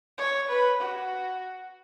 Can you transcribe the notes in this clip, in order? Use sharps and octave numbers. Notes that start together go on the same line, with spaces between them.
C#5
B4
F#4